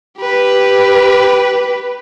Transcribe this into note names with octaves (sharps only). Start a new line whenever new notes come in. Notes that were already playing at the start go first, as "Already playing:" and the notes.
G4 B4